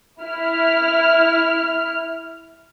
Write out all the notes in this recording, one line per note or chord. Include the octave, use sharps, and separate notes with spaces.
E4 F6